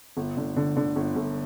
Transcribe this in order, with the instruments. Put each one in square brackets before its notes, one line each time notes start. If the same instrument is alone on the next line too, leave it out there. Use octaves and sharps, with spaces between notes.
[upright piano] G1
D3
D3
D3
G1
G1